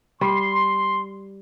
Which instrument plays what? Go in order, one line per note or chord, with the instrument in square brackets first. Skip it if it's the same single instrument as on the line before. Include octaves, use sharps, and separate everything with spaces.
[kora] G3 [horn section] C6